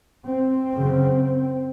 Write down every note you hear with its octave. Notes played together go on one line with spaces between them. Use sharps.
C4
F#2 C#3